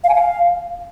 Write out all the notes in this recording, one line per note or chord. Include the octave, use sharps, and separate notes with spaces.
F5
G#5
F5